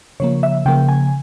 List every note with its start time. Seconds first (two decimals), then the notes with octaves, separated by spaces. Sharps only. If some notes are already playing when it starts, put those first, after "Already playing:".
0.20 C#3 F3 A#3 C#5
0.43 E5
0.66 C#3 F3 A#3 G5
0.89 G#5